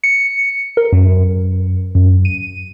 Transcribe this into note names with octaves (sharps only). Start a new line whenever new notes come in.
C#7
A#4
F#2
F#2
D#7